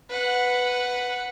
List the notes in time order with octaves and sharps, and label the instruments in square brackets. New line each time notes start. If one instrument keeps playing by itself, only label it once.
[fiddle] B4 F#5